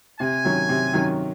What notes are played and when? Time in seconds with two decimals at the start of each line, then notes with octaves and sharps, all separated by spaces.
0.19 C3 G#5
0.45 D#3 F#3 C#4
0.69 C3
0.93 D#3 F#3 C#4